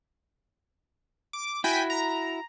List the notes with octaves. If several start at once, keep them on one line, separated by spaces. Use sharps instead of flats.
D6
E4 F#4 G5 G#5 B6
A#5